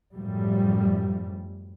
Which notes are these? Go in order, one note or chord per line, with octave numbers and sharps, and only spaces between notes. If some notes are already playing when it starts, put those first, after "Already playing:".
F#2 A2 F3 G3